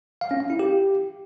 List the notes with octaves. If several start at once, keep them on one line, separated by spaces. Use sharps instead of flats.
F5
C#4
F5
E4
G4